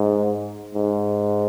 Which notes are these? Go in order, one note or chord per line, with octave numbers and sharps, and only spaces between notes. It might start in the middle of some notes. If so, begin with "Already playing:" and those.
Already playing: G#2
G#2